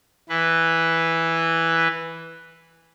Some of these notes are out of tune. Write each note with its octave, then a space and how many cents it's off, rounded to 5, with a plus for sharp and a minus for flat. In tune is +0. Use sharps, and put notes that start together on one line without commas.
E3 +0 B4 +0